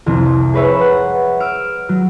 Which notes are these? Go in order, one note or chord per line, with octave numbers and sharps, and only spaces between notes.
C2 F2 C3 F3
G#4 A#4 B4 C#5 E5
F#5
E6 F6 D7
F#3